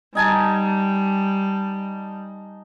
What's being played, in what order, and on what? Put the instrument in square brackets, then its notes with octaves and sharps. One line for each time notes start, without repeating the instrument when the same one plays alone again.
[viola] G3 [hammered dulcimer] D#4 G#5 A5